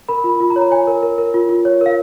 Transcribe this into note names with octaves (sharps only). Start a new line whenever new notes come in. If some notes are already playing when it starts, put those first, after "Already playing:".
A#4 B5
F4
B5
F4
A#5
C#5
A#5
C#5 G#5
A#4
A#4
A#4
F4
F4
C#5
A#4 F5